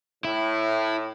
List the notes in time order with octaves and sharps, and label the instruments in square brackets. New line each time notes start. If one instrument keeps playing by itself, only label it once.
[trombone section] A2 [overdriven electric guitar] E4